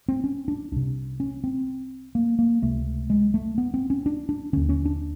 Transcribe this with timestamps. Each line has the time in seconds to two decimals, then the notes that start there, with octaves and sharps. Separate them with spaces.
0.08 C4
0.24 C#4
0.48 D4
0.72 C2 C3 D4
1.20 C#4
1.44 C4
2.15 A#3
2.39 A#3
2.63 C#2 C3 A3
3.10 G#3
3.34 A3
3.58 B3
3.74 C4
3.90 C#4
4.06 D4
4.29 D4
4.53 D#2 D3 C#4
4.69 C#4
4.86 D4